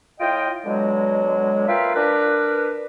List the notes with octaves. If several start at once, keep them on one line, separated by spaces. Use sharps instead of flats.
A2 F4 D#5 G5
B2 D3 F#3 G#3
A#3 F4 B4 E5 F5 G5
D4 A#4 B4